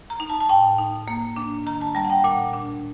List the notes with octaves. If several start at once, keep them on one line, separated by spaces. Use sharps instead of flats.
A#5
D#4
A5
A5
A2 G5
D#4
A#3
D4
D#3 A#5
A5
G3 A#5
F#5
G5
A#2 F#5
D4